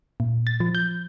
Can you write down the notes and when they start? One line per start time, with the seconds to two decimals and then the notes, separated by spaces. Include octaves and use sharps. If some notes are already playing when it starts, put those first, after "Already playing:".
0.20 A#2
0.47 A6
0.60 F3
0.75 G6